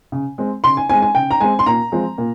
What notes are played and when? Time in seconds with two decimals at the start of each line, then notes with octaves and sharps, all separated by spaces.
0.12 C#3
0.38 G#3 C4
0.64 C#3 C6
0.77 G#5
0.89 C4 G#5
0.93 G#3
1.02 G#5
1.15 C#3 G5
1.31 A#5
1.41 G#3 C4 G#5
1.59 C6
1.66 A#2 A#5
1.92 F3 G#3 C4
2.18 A#2